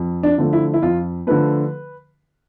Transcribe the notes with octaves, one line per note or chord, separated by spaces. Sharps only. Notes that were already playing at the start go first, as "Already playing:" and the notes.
Already playing: F2
D4
D3 F3 A3
E4
E4
F2 F4
D3 F3 A3 B4